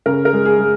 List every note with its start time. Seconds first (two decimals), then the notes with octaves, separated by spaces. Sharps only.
0.06 C#3 A#4
0.25 A#4
0.33 G#3
0.45 G#4
0.58 G#3